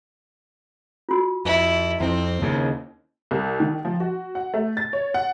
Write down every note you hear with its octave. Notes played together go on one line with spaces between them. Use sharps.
F4 F#4
F2 E4
F2 F3 C4 E4
D#2 C#3
C2
D#3
F3
F#4
F#5
A3
A6
C#5
F#5